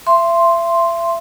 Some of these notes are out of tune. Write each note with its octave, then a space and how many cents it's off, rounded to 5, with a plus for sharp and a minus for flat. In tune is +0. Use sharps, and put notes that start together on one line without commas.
E5 +35 C6 +0